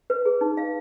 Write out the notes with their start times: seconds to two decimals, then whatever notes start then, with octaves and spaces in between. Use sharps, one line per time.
0.10 B4
0.25 G#4
0.41 D#4
0.57 F5